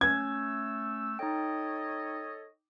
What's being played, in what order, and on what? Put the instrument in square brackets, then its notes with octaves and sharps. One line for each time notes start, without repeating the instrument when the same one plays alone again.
[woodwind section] A3 E6 [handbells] C#4 [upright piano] G#6
[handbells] D#4 G5 [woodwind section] A4 C#5 D#5